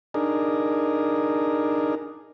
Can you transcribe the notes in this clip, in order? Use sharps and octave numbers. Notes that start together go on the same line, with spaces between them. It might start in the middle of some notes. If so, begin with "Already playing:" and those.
D4 D#4 G#4 A#4